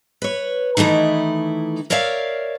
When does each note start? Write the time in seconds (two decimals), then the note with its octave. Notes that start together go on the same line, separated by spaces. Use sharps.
0.22 B4 C#5
0.77 D#3 E3 A3 D#4 E4
1.90 A#4 C#5 D5 E5 F5